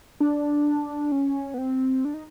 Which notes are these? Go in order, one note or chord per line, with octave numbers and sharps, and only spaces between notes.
D4
C#4
B3
C4
D4
D#4